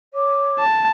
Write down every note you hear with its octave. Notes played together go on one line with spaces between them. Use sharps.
C#5 D6
A5